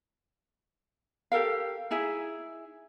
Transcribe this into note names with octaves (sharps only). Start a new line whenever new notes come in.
G4 A4 A#4 F5
D#4 E4 G#4 E5